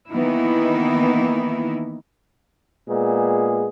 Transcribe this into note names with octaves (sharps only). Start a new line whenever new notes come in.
D#3 E3 A#3 B3 D#4 E4
A#2 G#3 B3 G#4